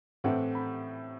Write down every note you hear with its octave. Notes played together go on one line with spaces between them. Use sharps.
A2 E3 A3 C4 F#5
B5